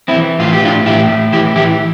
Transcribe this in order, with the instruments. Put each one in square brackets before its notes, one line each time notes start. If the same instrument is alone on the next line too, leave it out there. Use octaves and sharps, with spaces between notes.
[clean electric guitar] C4 E4
E3
A2 F4
G4
E3 D4 F4
A2 E4 G4
A2
E3 E4 G4
E3 E4 G4